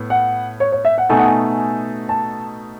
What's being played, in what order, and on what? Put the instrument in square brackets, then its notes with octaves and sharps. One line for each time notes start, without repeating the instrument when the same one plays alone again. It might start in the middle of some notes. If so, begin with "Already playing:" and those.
Already playing: [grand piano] A2 B3
[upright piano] F#5
C#5
C#5
E5
F#5
[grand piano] B2 A3 D#4 A4 [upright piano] G#5
[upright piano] F#5
G#5
A5